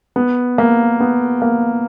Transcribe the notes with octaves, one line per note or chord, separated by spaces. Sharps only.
B3
A#3
B3
A#3